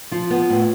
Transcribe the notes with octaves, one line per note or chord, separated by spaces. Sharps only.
F3 F4
B3
A2